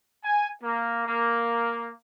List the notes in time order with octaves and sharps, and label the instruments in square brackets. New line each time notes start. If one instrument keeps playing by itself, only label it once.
[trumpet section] G#5
A#3
A#3